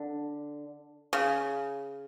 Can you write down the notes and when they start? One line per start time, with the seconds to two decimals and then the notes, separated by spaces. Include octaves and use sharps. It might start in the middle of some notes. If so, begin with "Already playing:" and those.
Already playing: D3
1.13 C#3